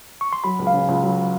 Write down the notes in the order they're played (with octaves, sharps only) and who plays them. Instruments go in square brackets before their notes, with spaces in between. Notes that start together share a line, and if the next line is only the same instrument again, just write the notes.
[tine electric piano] C#6
C6
[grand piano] F#3 [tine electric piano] B5
[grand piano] C#2
[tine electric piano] F5
[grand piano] C#3
C#2
F#3